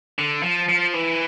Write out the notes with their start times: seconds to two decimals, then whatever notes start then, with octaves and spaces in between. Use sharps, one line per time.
0.19 D3
0.43 F3
0.68 F3
0.93 E3